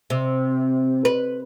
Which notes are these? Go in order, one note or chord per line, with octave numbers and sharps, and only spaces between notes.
C3
B4